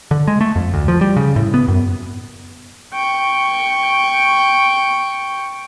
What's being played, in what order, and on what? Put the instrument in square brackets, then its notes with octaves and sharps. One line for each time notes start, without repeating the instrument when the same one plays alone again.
[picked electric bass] D3
G#3
A3
F2
D2
F3
G3
C#3
A2
B3
F#2
[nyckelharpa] G5 C#6